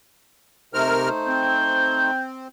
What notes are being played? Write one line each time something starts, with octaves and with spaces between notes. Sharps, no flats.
C3 A3 D#4 A#4 C5 F6
C4 G6